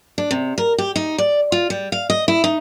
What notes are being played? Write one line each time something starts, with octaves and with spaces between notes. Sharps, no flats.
D4
C3
A#4
G4
D#4
D5
F4
G3
F5
D#5
E4
D#4